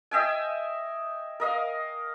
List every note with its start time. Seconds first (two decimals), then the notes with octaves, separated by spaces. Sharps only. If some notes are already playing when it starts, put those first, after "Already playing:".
0.11 D#5 E5 G5 G#5
1.40 A#4 D#5 F5